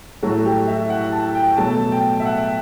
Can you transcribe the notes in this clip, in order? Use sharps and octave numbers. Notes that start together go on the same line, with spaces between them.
A2 F#3 A3 F#4
G4
E5
F#5
A5
G5
B2 F#3 A3 A5
G5
E5
F#5